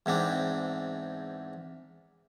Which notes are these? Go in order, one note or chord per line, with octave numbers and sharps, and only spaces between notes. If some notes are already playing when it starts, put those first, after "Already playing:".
E2 G#2 C4 D4